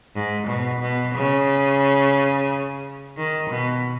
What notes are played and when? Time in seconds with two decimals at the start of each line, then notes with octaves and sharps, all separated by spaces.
0.15 G#2
0.48 B2
0.82 B2
1.16 C#3
3.17 D#3
3.51 B2